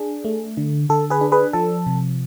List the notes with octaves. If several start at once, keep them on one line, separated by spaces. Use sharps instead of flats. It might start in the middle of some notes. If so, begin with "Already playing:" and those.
Already playing: D4 G#4
A3
D3
D3 A4
G#4 B4
D4
G#4 B4
F3 A4
C3